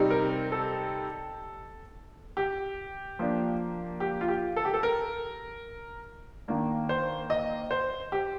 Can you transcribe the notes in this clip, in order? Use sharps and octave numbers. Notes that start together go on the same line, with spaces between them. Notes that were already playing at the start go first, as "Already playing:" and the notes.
Already playing: C3 G3 C4 D#4
A#4
A4
G4
F3 A#3 D4
G4
F4
G4
A4
G4
A4
A#4
D#3 A#3 D4
C5
D#5
C5
G4